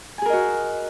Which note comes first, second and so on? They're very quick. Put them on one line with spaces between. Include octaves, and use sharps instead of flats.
G#5 G#4 A#4 D#5 F#4